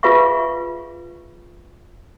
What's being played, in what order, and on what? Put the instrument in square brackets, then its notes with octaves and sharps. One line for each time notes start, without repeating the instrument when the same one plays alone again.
[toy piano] F4 G#4 B4 E5 F5 C#6